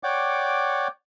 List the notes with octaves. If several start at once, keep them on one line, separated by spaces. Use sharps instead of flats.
C#5 D5 F#5 G5 D6